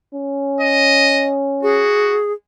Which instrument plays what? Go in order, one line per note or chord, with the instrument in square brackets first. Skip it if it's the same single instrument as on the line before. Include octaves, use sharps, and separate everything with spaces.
[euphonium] C#4
[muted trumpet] D#5
[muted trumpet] F#4 [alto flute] G#4